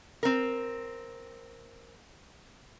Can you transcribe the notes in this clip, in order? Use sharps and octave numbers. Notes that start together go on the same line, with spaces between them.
C4 A#4